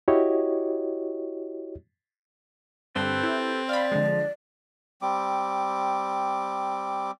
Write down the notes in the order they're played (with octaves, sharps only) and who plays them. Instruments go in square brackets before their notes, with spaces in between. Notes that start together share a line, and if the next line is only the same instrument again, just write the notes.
[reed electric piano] E4 F#4 G4 C#5 D#5
[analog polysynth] G2 D3 [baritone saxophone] C4 [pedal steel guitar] G4 A4 B4
[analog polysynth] E4
[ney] D5 [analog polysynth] F5 B5
[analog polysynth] D3 G#3 [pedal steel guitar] F3
[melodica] G3 C4 D6